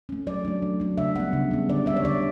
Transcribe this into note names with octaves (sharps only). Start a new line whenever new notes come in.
A3 C#4
F#3 D5
A3 D4
F#3
A3 D4
C#3 E5
G3 B3 D4 F#5
C#3
G3 B3 D4
D3 D5
G3 D4 E5
C#5
D3 D5